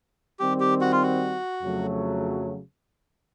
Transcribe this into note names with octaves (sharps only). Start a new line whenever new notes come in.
D#3 G3 C4 G4
G4
F#4
F4
F#4
F2 C#3 F#3 A3